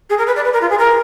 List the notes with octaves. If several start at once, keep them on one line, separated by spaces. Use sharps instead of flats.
G#4
A#4
B4
D5
B4
A#4
F4
G#4
A#4